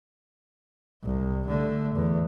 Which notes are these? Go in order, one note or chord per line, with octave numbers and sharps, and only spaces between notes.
C2
D3 A3
E2